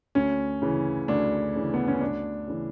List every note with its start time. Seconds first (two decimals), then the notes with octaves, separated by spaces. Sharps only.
0.15 D2 C#4
0.62 C#3 E3
1.08 D2 D4
1.55 C#3 E3
1.74 B3
1.88 C#4
2.01 D2 D4
2.48 C#3 E3